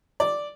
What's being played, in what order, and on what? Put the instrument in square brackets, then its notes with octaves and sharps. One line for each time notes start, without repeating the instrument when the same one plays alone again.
[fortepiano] D5